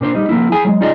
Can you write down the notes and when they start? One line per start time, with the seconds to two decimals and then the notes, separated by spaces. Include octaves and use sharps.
0.01 A#2 D4 C5
0.15 G3 D#4
0.29 F3 A#3 E4
0.52 E4 G#4 G#5
0.65 F#3 G#3
0.81 D#4 F4 G#4 D5 D#5